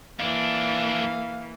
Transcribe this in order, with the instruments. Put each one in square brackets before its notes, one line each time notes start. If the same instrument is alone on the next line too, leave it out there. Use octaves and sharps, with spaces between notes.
[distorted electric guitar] F2 D4 [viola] E3 A#3 [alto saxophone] F5